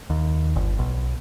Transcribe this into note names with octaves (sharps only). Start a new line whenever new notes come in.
D#2
G1
B1